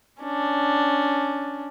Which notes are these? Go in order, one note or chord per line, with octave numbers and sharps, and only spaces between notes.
C#4 D4